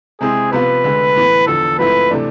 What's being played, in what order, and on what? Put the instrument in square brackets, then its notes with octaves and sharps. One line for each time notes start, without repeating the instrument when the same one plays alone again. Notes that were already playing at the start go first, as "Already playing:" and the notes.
[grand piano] C3 G#3 C4 E4 [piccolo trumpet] G#4
[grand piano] C3 F3 B3 F4 [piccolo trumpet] B4
[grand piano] D2 D3 G#3
A2 E3 B3
[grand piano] E2 D3 F3 [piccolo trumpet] A4
[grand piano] G#2 F3 A3 C4 E4 [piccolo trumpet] B4
[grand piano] C3 E3 A3 D4